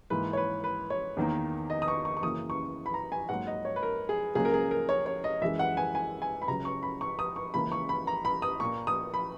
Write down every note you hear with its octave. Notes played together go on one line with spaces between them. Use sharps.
G#2 E3 A#3 B4
C#5
B4
B4
C#5
E2 D#3 A#3
D#5
D#6
C#6
C#6
C#6
F#2 C#3 E3 A#3 D#6
C#6
B5
A#5
G#5
G#2 F#3 A#3 F#5
D#5
C#5
B4
A#4
G#4
C#2 C#3 F#3 A#3 G#4
A#4
G#4
A#4
C#5
C#5
D#5
F#2 E3 G#3 E5
F#5
G#5
G#5
G#5
B5
C#2 C#3 F#3 A#5
C#6
B5
C#6
D#6
C#6
C#2 C#3 E3 A#3 B5
C#6
B5
A#5
B5
D#6
A#2 A#3 C#6
D#6
B5